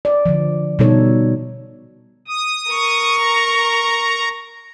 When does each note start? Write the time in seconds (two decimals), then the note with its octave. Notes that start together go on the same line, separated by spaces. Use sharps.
0.05 D5
0.26 D3 F3
0.79 B2 G3 D#4 A4 C#5
2.28 D#6
2.71 A#4 C#6
3.18 A#5